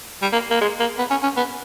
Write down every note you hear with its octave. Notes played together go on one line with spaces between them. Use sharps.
G3
A#3
A#3
G#3
A#3
B3
C#4
C#4
B3